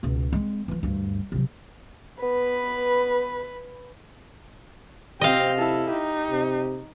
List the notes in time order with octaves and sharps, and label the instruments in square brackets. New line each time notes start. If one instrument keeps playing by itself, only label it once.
[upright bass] C#2 B2
G#3 C4
E3 F3
D2 G2
C3 F#3
[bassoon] B3 [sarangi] B4
[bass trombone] C3 [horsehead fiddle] C4 G5 [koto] D#5 F5
[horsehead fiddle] E4 A4
[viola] D#4 [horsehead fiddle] G4
[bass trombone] C3